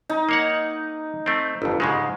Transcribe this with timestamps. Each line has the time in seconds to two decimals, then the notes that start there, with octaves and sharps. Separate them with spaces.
0.09 D#4
0.29 A#3 C#5 F#5
1.26 A3 C4
1.62 G1 F2
1.80 G#2 C#3 G#3